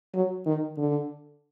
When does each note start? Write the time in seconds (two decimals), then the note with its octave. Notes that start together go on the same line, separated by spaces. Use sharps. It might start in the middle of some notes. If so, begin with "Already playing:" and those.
0.14 F#3
0.46 D#3
0.78 D3